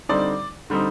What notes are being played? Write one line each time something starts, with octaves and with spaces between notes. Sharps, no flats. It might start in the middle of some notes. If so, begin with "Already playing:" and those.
D3 G3 C4 D#4 D5
D3 G3 C4 D#4